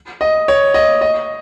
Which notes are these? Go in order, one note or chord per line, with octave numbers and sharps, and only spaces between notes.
D#5
C#5
D#5
D#5